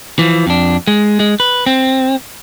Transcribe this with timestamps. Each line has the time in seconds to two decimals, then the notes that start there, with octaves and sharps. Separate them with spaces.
0.19 E3 F3
0.47 F2 D4
0.87 G#3
1.20 G#3
1.40 B4
1.66 C4